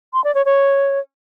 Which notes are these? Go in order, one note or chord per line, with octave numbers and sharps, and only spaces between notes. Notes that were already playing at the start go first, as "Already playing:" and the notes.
C6
D5
C#5
C#5